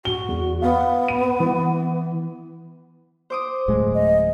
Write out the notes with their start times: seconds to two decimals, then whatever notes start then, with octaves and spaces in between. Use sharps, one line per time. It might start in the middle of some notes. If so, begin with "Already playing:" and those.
0.05 F#4 G7
0.28 E2
0.62 B3 F5
1.08 D#7
1.40 E3
3.30 C5 D6 D#6
3.68 D1 A2 G#3
3.94 D#5